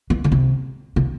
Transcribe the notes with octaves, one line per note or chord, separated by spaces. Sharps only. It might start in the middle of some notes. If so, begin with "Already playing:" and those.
E3
D3
C3
C3